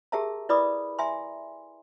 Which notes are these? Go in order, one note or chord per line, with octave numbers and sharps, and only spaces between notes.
G4 G#4 A#4 E5 A5 A#5
E4 B4 D5 B5 D6 D#6
E5 G#5 A#5 C6